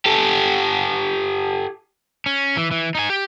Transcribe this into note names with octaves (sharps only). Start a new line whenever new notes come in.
G4 A4
C#4
E3
E3
D#4 G#5
G4